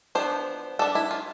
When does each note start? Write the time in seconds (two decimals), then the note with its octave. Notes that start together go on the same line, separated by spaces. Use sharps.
0.15 F3 B3 D4 C5
0.79 G3 D4 A4
0.95 E4
1.11 F4